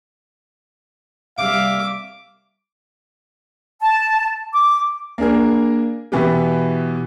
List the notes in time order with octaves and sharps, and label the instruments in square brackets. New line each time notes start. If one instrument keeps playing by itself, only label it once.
[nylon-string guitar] C3 G3 [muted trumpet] E5 [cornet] F5 [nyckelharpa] D6
[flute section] A5
D6
[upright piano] A#3 D4 G#4 A#4
B2 E3 B3 G4